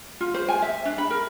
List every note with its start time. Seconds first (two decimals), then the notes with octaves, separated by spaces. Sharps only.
0.21 F4
0.34 C5
0.49 G#5
0.62 E5
0.85 D4
0.98 B5
1.10 A#4